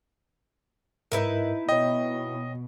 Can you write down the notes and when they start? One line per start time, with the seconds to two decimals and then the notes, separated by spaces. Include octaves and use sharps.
1.12 G#2 D#4 E4 A#4 B4
1.69 B2 C#5 D#5 G5